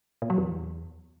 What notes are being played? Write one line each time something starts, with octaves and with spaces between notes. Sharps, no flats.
A#2
F#3
E2